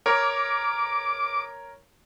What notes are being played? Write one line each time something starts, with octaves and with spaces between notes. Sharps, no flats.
A#4 C#5 D6